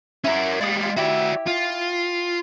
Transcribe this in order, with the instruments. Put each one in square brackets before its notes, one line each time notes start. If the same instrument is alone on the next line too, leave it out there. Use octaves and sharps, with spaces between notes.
[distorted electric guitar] C#4 A#4 [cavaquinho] E4 D5
[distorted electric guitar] G3 G#3 [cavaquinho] D5 F5 D#6
[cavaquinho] F4
[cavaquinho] E4 G4 E5 [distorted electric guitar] F#4 D5
[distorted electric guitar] F4